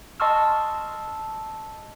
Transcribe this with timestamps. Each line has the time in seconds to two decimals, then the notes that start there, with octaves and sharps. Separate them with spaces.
0.20 D#5 A5 C6 C#6 E6 F6